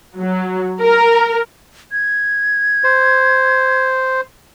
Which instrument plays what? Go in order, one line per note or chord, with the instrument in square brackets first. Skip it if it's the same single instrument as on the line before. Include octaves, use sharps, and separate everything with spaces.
[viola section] F#3
A#4
[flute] G#6
[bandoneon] C5